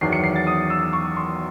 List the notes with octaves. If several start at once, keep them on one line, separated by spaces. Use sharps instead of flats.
E2 D#3 F#3 C7
C#7
C7
A6
D#6
E6
C#6
C6